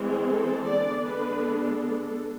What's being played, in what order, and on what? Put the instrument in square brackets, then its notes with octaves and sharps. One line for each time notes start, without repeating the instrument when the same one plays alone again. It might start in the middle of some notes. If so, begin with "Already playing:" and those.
Already playing: [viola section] E3 G#3 C4
A4
D3 G#3 B3 D4 D5
B4
A4
A4